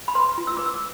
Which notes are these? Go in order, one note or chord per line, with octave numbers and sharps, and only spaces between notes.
B5
B4 C6
F4
E6
B4 D6
E6